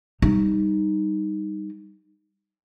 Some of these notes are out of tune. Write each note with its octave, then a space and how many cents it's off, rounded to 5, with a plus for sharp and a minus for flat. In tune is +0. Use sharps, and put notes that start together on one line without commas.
G3 +0 D#4 +0